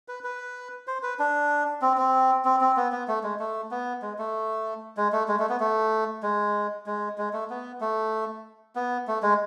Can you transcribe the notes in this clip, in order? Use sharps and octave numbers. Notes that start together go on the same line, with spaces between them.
B4
B4
C5
B4
D4
C4
C4
C4
C4
B3
B3
A3
G#3
A3
B3
G#3
A3
G#3
A3
G#3
A3
B3
A3
G#3
G#3
G#3
A3
B3
A3
B3
A3
G#3